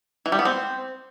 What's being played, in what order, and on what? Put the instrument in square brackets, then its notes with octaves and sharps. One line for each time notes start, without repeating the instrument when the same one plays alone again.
[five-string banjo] E3
G3
B3
C4